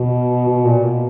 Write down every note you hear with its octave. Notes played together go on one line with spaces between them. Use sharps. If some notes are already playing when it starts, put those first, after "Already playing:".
Already playing: B2
B2
A#2
B2